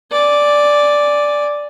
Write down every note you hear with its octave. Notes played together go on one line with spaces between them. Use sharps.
D5 G#5